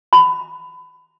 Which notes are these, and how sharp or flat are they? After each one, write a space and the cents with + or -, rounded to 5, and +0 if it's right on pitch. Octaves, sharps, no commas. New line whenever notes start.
B5 +25